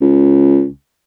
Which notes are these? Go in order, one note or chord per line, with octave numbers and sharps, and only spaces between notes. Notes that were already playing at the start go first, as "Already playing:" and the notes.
C#2